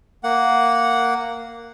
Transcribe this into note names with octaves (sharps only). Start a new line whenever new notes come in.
A#3 F#5